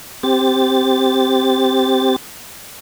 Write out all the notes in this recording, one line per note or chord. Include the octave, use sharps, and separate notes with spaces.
C4 G4 A6